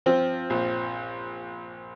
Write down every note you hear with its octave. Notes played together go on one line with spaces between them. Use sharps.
F3 C4
A#1